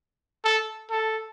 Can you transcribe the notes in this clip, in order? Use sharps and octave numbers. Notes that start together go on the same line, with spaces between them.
A4
A4